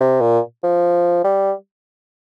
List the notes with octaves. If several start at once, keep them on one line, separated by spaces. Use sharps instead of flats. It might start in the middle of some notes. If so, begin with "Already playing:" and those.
C3
A#2
F3
G3